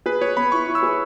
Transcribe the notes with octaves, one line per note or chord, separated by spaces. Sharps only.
G#4 B4
G#4 C#5
B3 B5
E4 C#6
E4
E6
G#4